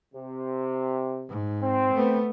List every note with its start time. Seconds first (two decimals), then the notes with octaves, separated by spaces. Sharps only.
0.13 C3
1.29 G#2
1.62 C4
1.94 A3 B3